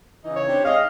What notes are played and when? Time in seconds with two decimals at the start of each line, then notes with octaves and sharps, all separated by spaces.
0.24 C#3 E3 D#4
0.36 C#5
0.48 C4 D4 G4
0.65 G#2 G#4 D#5 F5